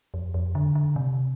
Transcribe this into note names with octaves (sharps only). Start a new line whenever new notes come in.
F2
F2
D3
D3
C3